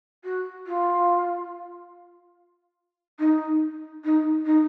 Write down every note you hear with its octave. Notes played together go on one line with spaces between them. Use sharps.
F#4
F4
D#4
D#4
D#4